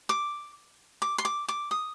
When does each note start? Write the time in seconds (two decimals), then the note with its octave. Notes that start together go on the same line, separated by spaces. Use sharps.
0.09 D6
1.02 D6
1.18 C6
1.25 D6
1.48 D6
1.71 D#6